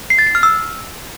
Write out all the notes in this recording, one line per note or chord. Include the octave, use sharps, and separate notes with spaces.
C7
A6
C7
F6
E6